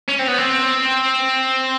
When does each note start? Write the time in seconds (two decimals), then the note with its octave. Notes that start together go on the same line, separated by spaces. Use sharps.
0.08 C#4
0.19 C4
0.28 B3
0.38 C4